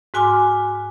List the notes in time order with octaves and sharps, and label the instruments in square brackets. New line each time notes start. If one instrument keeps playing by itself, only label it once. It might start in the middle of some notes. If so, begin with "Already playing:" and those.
[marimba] G#2 F#4 G#5 C6 D6 F6